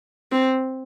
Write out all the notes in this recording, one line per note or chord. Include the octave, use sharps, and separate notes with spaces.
C4